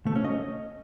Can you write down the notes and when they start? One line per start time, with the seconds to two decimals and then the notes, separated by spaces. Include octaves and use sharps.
0.06 A3
0.15 C#4
0.24 D#5